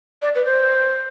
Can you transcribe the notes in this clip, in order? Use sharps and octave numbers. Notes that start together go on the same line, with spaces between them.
D5
B4
C5